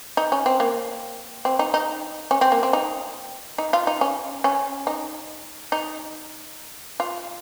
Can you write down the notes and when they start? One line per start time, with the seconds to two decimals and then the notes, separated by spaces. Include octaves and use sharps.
0.17 D#4
0.32 C#4
0.46 C4
0.60 A#3
1.45 C4
1.59 D#4
1.74 D#4
2.31 C#4
2.41 C4
2.52 A#3
2.63 C4
2.73 D#4
3.58 D#4
3.73 F4
3.87 D#4
4.01 C#4
4.44 C#4
4.87 D#4
5.72 D#4
7.00 F4